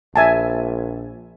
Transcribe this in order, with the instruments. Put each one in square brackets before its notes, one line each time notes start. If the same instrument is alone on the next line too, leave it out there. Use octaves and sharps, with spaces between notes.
[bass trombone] A#1 [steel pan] E5 G#5 A5